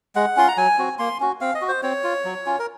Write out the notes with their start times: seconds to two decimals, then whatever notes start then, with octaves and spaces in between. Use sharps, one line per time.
0.16 G#3 F#5
0.36 C#4 F4 C6
0.48 A#5
0.57 F#3 G#5
0.79 C4 F#4
0.99 A#3 C6
1.20 C#4 F#4
1.41 C4 F5
1.55 D#5
1.62 F#4
1.69 C5
1.83 C4 C#5
2.04 F4
2.24 F#3
2.46 C#4 F4
2.59 A#4